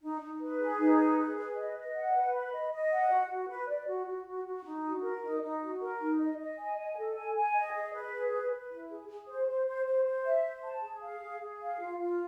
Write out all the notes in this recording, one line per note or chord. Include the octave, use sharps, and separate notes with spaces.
D#4
D#4
B4
G#4
D#4
B4
G#4
B4
D#5
D#5
F#5
B4
B5
D#5
D#5
F#5
F#4
F#4
B4
D5
F#4
F#4
F#4
F#4
D#4
F#4
A#4
D#4
D#4
F#4
A#4
D#4
D#5
D#5
G#5
D#5
A4
G#5
G#5
D#5
G#4
B4
G#4
B4
B4
E4
G#4
G#4
C5
C5
C5
C5
C5
E5
C5
A5
G#4
F5
G#4
G#4
F5
F4
F4